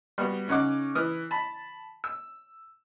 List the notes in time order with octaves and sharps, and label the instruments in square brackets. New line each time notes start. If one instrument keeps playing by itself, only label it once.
[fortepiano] G3 B3 F#4 G4
C#3 C#4 D#4 F#5 D6
E3 D#6 F6
A5 B5
E6